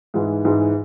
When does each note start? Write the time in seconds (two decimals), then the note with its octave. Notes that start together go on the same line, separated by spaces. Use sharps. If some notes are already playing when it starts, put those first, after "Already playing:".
0.14 G#2 E3 G#3
0.45 G#2 E3 G#3